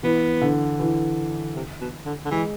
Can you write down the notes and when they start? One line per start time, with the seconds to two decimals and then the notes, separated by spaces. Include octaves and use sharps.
0.03 E3 B3
0.42 D3
0.80 E3
1.55 C3
1.81 B2
2.05 D3
2.25 D3
2.31 E3 G#3